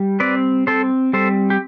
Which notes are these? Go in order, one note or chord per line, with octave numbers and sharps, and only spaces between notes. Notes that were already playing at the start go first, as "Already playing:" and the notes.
Already playing: G3
C4 B4 D5
C4 A4 C5
G3 A4 C5
G4